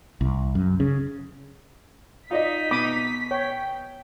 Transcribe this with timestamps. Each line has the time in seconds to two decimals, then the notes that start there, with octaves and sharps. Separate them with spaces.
0.21 C2
0.55 F#2
0.80 C#3
2.31 D#4 F4 D5 D#5 B6
2.71 B2 B5 D6 D#6
3.31 C#5 G5